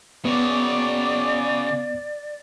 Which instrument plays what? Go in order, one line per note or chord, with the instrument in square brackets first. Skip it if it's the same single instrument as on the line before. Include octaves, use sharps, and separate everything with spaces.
[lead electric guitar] C#3 F#4 [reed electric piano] B3 [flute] D5 [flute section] D6